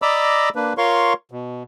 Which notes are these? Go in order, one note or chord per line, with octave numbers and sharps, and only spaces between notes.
D5 D#5 A#5 B5 D6 E6
A#3 D4 B4
F4 A#4 C#5 F5 C6 C#6
B2